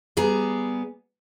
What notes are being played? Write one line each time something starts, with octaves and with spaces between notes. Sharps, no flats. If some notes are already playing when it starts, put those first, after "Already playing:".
G3 B3 G#4 A#5